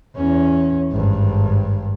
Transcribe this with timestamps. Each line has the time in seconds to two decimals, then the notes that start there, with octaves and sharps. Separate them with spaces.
0.16 E2 C#4
0.92 G#1 G2